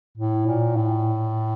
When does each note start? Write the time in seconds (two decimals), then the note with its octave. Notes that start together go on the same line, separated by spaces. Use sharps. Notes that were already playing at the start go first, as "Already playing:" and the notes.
0.17 A2
0.47 A#2
0.76 A2